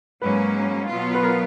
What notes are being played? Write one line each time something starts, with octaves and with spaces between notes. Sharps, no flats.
G#2 F#3 A#3 C#4 B4
B2 F#3 B3 F4
B4
A#4